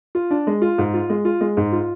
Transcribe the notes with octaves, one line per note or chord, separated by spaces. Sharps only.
F4
D4
G#3
F4
G#2
F4
G#3
F4
G#3
G#2
F4